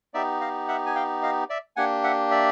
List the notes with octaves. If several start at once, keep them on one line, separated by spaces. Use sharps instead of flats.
B3 D#4 G4 D5 E5
D#5 F5
E5 F#5
G#5
F5 G5
D#5 F5
D5 E5
A#3 D4 G4 F#5 G#5
E5 F#5
D5 E5